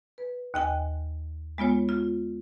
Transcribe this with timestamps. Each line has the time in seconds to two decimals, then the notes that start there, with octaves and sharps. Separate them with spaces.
0.18 B4
0.54 D#2 D#5 G5 G#5
1.58 G#3 B3 F4 C#5
1.89 F4